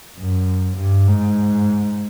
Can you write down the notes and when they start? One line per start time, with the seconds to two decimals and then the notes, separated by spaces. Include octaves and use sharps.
0.19 F#2
0.78 G2
1.08 G#2